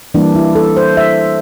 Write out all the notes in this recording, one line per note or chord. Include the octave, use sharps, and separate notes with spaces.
E3 G3 A#3 D4
E4
A4
C5
E5